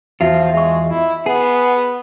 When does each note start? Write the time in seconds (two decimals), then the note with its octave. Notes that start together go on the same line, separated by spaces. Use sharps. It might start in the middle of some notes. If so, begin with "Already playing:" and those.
0.21 E2 F3 F4 F#4 E5
0.54 G#3 E5 C#6
0.90 E4
1.26 B3 G#4